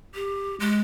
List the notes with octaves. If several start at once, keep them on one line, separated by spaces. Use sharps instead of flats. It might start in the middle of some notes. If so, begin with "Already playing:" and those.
G4
G#3